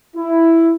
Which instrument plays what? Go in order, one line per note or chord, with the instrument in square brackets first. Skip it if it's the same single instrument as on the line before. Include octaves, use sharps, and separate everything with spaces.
[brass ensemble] E4